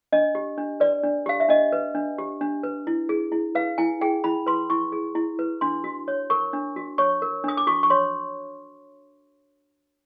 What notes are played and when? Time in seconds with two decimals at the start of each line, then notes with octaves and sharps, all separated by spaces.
0.12 D4 D#5
0.35 G4
0.58 D4
0.80 B4 D5
1.03 D4
1.26 G4 F5
1.40 E5
1.49 D4 D#5
1.72 B4
1.95 D4
2.18 G4
2.41 D4
2.63 B4
2.87 E4
3.09 G#4
3.32 E4
3.55 B4 F5
3.78 E4 G#5
4.01 G#4 G5
4.24 E4 B5
4.46 B4 C6
4.70 E4 C#6
4.92 G#4
5.15 E4
5.39 B4
5.61 D4 C6
5.84 F#4
6.08 C#5
6.30 A#4 C#6
6.53 D4
6.76 F#4
6.98 C#5 C#6
7.22 A#4
7.44 D4 D#6
7.57 D6
7.67 F#4 C#6
7.83 C#6
7.90 C#5 C6